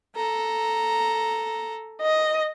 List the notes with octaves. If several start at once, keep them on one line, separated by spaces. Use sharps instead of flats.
A4 A#5
D#5